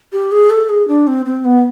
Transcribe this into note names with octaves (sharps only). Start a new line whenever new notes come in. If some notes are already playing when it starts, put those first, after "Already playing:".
G4
G#4
A4
G#4
D4
C4
C4
B3